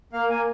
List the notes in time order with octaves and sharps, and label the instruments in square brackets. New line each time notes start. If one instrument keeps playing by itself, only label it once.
[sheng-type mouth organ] A#3 F5
A#3 G#5